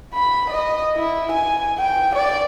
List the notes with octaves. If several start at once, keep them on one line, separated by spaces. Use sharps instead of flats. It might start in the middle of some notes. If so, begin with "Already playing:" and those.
B5
D#5
E4
G#5
G5
D5